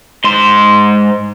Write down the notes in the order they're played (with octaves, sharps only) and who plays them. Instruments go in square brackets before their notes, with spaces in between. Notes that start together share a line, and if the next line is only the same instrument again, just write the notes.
[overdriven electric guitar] G#2 C6